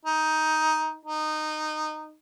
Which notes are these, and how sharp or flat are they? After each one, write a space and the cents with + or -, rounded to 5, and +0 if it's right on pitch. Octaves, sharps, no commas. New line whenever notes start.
D#4 +10
D#4 -15